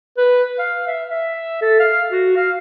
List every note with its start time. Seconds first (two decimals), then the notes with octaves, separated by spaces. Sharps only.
0.17 B4
0.59 F5
0.87 E5
1.11 E5
1.62 A4
1.79 F5
2.12 F#4
2.36 F5